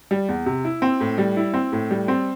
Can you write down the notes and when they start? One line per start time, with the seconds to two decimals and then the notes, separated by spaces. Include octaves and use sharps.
0.11 G3
0.28 E2
0.46 C3
0.65 E4
0.82 C4
1.00 A2
1.18 G3
1.37 E4
1.54 C4
1.72 A2
1.91 G3
2.08 C4